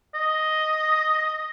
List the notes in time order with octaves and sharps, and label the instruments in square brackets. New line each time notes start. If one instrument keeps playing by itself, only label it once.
[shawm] D#5